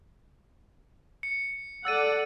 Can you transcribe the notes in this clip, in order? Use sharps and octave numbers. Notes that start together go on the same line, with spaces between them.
C#7
A4 D5 F#5 E6 A6 D#7